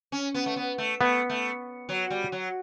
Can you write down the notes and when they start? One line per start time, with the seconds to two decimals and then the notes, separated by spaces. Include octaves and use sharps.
0.12 C#4
0.34 B3
0.46 A3
0.56 B3
0.78 A3
1.00 A3 B3
1.30 A3
1.89 F#3
2.10 G3
2.32 F#3